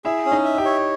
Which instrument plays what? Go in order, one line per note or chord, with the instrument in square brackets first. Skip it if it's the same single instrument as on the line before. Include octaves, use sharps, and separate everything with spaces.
[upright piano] E4 E5 [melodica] G#4
[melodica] C#4
[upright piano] D#4 D#5
[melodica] E5
[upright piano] G4 G5
[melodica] C#5